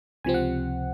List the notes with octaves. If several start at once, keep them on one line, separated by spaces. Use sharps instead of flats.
C#2 C3 F3 C4 G#5
F#5